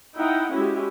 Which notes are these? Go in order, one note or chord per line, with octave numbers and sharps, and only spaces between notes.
D#4 E4 F#5 G5
G#3 C#4 E4 F#4 G4